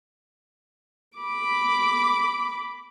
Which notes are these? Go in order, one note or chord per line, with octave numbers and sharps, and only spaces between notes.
B5 D6